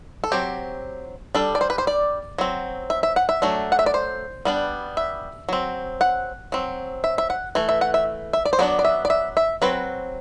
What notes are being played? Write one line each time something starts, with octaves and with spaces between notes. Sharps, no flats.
A4
F#3 C4 G4
G3 D4 A4
D5
C5
B4
C5
D5
F#3 C4
E5
E5
F#5
E5
F#3 A3 D4
F#5
E5
D5
C5
G3 B3 D4
E5
F#3 C4
F#5
F#3 C4
E5
E5
F#5
E3 A3
E5
F#5
E5
E5
D5
C5
F#3 B3 D4 D5
D5
E5
D5
E5
E5
F#3 C4 B4